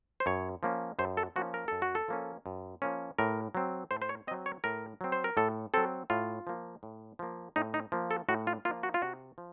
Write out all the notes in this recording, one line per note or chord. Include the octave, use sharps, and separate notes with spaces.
C5
F#2 C#5
F3 A#3 C#4
F#2 C5
A4
F3 A#3 C#4 F#4
A#4
F#2 A4
F#4
A4
F3 A#3 C#4
F#2
F3 A#3 C#4
A2 A#4
F#3 C4
A2 C5
C5
C#5
F#3 C4 D#5
C#5
A2 A#4
F#3 C4
C5
A#4
A2 A4
F#3 C4 A4
A2 F4
F3 A#3
A2
F3 A#3
A2 D#4
D#4
F3 A#3
A4
A2 F#4
F4
F3 A#3 F4
F#4
F4
C3 F#4
F3